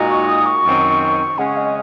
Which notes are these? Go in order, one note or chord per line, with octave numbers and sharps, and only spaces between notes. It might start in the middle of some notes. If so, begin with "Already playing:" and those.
Already playing: A#2 G#3 D#4 F#4
C#6
D#6
C#6
F#2 D#3 F#3 C4
C#3 G#3 C#4 G#4 F#5
D#5